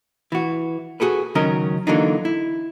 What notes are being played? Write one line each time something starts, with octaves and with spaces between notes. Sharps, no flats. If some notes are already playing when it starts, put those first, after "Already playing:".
E3 F#4
F#4 G#4 A4 B4
C#2 D#3 F#3 C#4 A#4 D#5
D3 E3 F#3 A#3 D4 D#4
E4